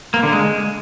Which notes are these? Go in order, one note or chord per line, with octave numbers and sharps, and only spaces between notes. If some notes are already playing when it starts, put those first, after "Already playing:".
A#3
D3
G#3